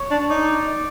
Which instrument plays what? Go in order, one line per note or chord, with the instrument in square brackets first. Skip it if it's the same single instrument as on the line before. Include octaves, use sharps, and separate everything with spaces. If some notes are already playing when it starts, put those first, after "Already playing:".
Already playing: [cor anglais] C#5
[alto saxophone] D4
[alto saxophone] D#4 [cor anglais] D5